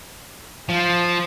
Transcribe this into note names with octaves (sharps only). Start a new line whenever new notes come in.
F3